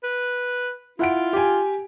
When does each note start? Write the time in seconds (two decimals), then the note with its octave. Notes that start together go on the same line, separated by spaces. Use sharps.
0.04 B4
0.99 E4 F4 F#5 D7
1.33 G4 G#5